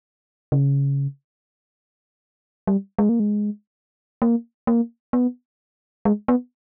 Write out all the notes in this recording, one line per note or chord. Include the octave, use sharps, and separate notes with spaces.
C#3
G3
G#3
A#3
G#3
A#3
A#3
B3
G#3
B3